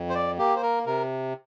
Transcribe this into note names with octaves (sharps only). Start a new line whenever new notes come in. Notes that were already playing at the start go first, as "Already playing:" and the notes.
Already playing: F2
C5
D5
A#3 G4
C5
A#4
C3 A#4